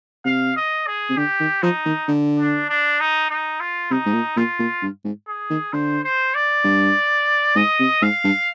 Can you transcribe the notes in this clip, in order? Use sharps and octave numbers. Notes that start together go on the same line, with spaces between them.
C3 F5
D#5
G#4
C3
D3 G4
D#3
F3 D#4
D#3
D3
D4
D4
D#4
D#4
F4
C3 D#4
G#2
A#2
A#2 F4
A#2
G2
G#2
G#4
D#3
D3 C5
C5
D5
G2
G#2 D#5
C3
G#2 F5
G2